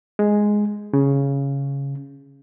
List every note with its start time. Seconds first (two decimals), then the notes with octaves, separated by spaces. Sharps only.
0.19 G#3
0.93 C#3